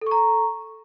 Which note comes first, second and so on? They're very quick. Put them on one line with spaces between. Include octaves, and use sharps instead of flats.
A4 C#6 A#5